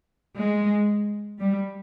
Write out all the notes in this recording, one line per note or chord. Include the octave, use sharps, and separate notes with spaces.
G#3
G3